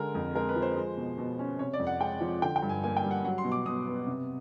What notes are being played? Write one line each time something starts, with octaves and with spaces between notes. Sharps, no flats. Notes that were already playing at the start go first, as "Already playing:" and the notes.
Already playing: D3 G#3 A#4
F2
G#3 A#4
B4
F3
C5
G#3
B2
B2
C#4
C3 C#5
D5
F2
F#5
G#3 G5
F3
D3 G5
G5
G2
G#5
A#3 G#5
G5
G3
F#5
F#3 F#5
C6
B2
D6
B2 D#6
B3
C3